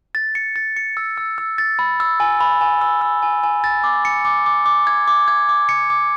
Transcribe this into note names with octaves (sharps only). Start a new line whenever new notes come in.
A6
C#7
A6
C#7
E6
E6
E6
A6
B5
E6
G#5
B5
G#5
E6
E6
G#5
G#5
A6
D6
C#7
D6
D6
D6
G#6
D6
G#6
D6
C#7
D6